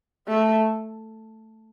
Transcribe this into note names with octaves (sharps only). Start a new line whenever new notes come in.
A3